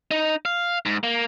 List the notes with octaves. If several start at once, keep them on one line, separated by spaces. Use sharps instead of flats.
D#4
F5
G#2
A#3